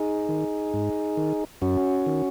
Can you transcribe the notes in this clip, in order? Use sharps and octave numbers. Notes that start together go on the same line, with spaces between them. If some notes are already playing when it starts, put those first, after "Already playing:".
Already playing: D#4 G#4
D#3
G#2
D#3
F#2 C#4 F#4
D#3